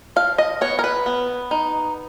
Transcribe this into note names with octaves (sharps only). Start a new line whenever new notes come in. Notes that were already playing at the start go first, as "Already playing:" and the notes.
F3 F5
D#5
B3 C#5
A#4
B4
B3
D#4